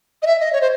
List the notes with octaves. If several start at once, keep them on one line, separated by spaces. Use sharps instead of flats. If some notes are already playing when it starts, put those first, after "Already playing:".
D#5
E5
D#5
C#5
C5